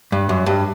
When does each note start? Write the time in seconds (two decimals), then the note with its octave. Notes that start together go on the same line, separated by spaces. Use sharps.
0.12 G2
0.29 F#2
0.46 G2